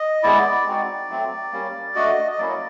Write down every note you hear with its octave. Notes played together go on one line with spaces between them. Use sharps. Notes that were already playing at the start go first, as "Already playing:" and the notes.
Already playing: D#5
G#3 B3 E4 D5
G#3 C4 D#4 F#4
F#3 A3 C4
G3 A#3 C#4
A3 D4 F#4 D#5
D#5
F#3 A#3 C#4 E4 D5